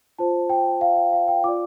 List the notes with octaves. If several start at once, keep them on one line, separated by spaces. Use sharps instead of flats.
F4 C5 A5
G5
F5
G5
F5
G5
F4 D5 D6